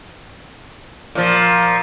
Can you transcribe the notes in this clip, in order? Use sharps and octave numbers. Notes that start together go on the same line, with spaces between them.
A#2 F3